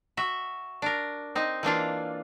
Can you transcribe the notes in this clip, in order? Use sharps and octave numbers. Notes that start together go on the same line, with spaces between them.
F#4 E5
D4 A#4
C4 D#4
E3 A#3 D4 F4